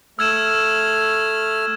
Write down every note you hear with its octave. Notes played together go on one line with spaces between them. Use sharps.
A3 E6 F6 G#6 E7